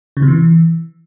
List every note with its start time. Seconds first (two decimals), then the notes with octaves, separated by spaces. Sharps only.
0.17 C#3
0.22 C3
0.28 E3